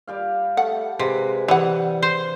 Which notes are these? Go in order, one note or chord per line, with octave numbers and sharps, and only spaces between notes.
G3 G4 F5
A3 F#5
C3 G#3 B4
E3 G3 E4 F#5
C5